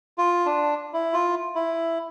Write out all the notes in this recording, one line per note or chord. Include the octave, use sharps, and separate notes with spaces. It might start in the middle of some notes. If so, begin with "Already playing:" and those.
F4
D4
E4
F4
E4